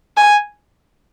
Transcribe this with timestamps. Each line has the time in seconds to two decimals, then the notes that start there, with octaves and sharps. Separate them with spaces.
0.17 G#5